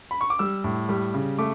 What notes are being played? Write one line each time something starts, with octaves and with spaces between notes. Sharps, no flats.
B5
C#6
D6
G3 E6
A2
G3
C#3
A3 D6